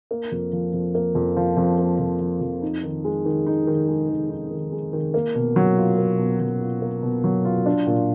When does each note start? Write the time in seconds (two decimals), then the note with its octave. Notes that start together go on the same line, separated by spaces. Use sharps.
0.11 A#3
0.32 F2
0.53 F3
0.74 F2
0.95 A#3
1.15 F2
1.36 F3
1.57 F2
1.78 A#3
2.00 F2
2.21 F3
2.41 F2
2.62 D#4
2.83 D#3
3.05 G#3
3.25 D#3
3.46 D#4
3.67 D#3
3.89 G#3
4.09 D#3
4.30 D#4
4.51 D#3
4.72 G#3
4.93 D#3
5.14 A#3
5.35 B2
5.56 F#3
5.77 F4
5.98 A#3
6.19 B2
6.40 F#3
6.61 F4
6.82 A#3
7.03 B2
7.24 F#3
7.45 F4
7.66 D4
7.87 A#2